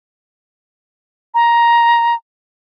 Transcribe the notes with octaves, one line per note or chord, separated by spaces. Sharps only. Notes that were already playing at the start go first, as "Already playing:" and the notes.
A#5